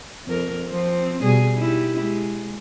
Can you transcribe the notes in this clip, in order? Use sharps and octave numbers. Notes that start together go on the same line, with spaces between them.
F2 A#4
F3 C4
B2 G3 G#4
D#4 E4 G4
G#3